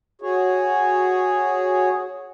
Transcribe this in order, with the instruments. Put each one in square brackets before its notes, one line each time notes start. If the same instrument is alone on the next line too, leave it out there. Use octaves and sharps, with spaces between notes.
[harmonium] F#4 G#4 C#5